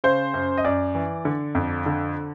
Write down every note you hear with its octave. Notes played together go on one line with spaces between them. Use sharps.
C#3 C5
F#2
D#5
F#2 D5
E3
D3
F2
D3